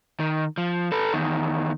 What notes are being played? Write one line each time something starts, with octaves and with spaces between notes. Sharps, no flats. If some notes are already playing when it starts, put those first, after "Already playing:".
D#3
F3
A4 B4
E2 D#3